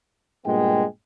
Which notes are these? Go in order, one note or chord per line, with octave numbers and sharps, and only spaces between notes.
G2 A#2 G#3 B3 G5